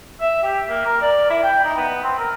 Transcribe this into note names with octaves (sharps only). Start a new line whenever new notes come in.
E5
G4
A#3
A#4
D5
E4
G5
D#4
B3
C4
A#4